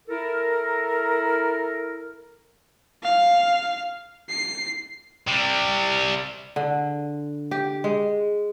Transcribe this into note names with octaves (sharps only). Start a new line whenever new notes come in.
E4 A4 A#4
F5
C7
C3 G3
D3
G4
G#3